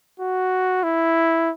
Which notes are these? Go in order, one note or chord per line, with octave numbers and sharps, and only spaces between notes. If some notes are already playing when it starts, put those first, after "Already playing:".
F#4
E4